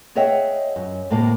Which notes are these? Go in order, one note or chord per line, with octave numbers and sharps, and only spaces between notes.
G#4 C#5 D#5 E5 F#5 G5
F#2
D2 A2 C3 A#3 F5